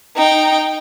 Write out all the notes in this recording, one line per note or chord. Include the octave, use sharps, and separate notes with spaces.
D#4 G5